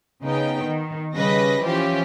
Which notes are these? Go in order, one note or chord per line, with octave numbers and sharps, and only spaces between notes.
C#3 B3 D#4 G5
D#3
C#3 G3 B4 D#5 A#6
E3 F3 C#4 F4 G4 C5